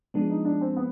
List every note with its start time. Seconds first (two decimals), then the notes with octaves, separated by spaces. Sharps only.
0.14 F3 G#3 B3 D4
0.30 D#4
0.45 D4
0.61 C4
0.76 B3